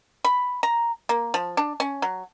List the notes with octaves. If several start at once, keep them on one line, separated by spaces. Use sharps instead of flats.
B5
A#5
A#3
F3
D4
C#4
F#3